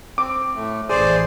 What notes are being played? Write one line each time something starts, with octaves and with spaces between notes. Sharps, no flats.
C4 D6
A2 A3
A1 G#4 C5 D5